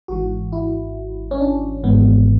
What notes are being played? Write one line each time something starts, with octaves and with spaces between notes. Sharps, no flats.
G#1 G#2 E3 F#4
E4
C#4
D4
G#1 G#2 E3 B3